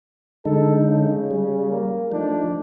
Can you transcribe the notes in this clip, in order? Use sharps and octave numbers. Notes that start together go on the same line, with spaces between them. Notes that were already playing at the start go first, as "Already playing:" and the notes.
D3 G#3 D#4 A4
C#3
G3
A#3
F3 A3 D4 D#4